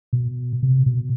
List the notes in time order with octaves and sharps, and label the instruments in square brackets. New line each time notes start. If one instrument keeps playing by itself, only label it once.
[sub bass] B2
C3
B2